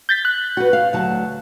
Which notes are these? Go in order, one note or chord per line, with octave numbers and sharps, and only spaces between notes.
G6 A6 B6
F#6
F#4 B4
F5
D2 F#3 A5